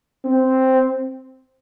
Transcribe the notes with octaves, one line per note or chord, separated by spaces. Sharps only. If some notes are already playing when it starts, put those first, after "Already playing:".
C4